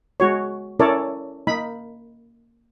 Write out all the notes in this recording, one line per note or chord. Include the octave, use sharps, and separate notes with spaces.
G#3 F#4 C#5
C#4 E4 A4 A#4 C#5 D5
A#3 D#4 B5